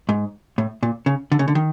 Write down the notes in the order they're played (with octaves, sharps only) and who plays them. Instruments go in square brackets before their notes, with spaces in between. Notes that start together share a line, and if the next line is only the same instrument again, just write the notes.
[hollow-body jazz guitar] G#2
A2
A#2
C#3
D3
C#3
D3
D#3